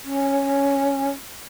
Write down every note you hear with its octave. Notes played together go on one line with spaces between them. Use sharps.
C#4